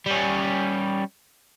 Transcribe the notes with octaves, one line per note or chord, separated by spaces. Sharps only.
G3 C#4